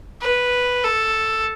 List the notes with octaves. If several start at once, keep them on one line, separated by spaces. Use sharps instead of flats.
B4
A4